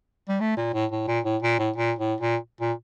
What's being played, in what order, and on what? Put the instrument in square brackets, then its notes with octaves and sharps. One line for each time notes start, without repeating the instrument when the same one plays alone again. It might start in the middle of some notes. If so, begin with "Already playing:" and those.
[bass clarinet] G3
A3
A#2
A2
A2
A#2
A2
A#2
A2
A#2
A2
A#2
A#2